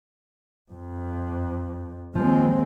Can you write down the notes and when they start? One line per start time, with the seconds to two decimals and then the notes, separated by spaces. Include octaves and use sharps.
0.71 F2
2.15 D#2 F3 G#3 C4